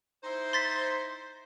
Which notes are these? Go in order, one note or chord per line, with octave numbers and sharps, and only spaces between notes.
D#4 E4 C5
C6 A6 B6